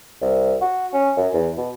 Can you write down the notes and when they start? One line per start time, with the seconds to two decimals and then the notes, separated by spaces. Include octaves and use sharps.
0.21 C2
0.61 F#4
0.93 C#4
1.17 F#2
1.34 E2
1.57 B2